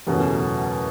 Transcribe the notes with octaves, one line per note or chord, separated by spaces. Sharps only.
F#1 E2 B2 A3 C#4